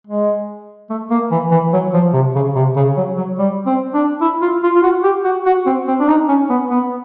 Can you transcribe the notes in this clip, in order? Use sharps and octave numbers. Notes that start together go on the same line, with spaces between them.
G#3
A3
A#3
E3
E3
F#3
F3
C3
C#3
C3
C#3
F#3
F#3
G3
C4
D4
E4
F4
F4
F4
F#4
G4
F#4
F#4
C4
C4
D4
D#4
C#4
B3
B3